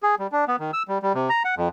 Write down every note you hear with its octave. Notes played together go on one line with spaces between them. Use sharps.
G#4
G3
D4
B3
D#3
E6
G3
G3
C3
A#5
F#5
F2